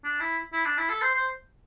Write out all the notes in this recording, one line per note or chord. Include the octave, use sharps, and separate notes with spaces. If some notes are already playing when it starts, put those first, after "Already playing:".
D4
E4
E4
D4
E4
A4
C5
C5